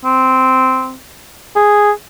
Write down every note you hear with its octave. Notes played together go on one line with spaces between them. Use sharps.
C4
G#4